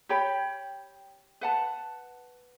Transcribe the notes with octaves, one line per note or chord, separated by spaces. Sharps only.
G4 C#5 G5 B5
B4 F#5 A5